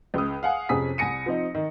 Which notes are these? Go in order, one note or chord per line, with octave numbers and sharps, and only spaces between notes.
C#2 D#6
F5 F#5 G#5
F2 C3 C#4 G#4 D#6 B6
C2 G#5 A#6 C#7 D#7
F3 C4 D#4
D#3